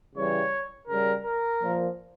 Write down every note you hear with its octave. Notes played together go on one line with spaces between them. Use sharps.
C#3 E3 G3 C#5
C#3 G3 A#4
A#4
A#2 F3